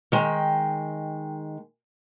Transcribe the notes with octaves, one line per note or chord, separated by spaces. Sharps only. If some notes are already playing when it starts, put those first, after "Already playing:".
D#3 G#3 G5